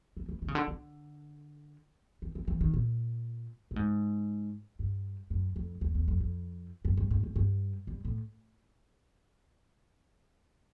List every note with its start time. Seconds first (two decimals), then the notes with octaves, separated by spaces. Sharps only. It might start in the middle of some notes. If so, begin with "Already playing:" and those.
0.17 E3
0.29 E3
0.42 D#3
0.48 C#3
0.55 D3
0.68 D3
2.22 D#3
2.35 E3
2.48 E3
2.61 D#3
2.74 A#2
3.71 A2
3.76 G#2
4.79 G2
5.30 F#2
5.56 F2
5.81 E2
5.95 E2
6.08 F2
6.20 F2
6.85 F#2
6.97 G2
7.11 G#2
7.23 G#2
7.36 G2
7.87 G2
8.05 A2